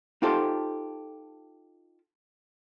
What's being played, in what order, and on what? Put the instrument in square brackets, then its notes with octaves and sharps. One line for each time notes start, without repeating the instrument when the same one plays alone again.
[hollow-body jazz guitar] D#4 F4 G4 A4 C5